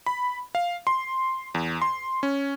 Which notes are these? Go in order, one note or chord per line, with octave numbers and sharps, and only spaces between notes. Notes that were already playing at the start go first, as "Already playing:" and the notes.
B5
F5
C6
E2
C6
C#4